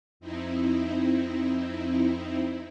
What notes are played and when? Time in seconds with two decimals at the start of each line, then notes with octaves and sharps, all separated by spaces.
0.20 F2 C4 D#4 E4